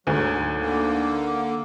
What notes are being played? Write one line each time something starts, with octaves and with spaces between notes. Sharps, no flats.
D2 G#2 D#3 F#3
D3 A#3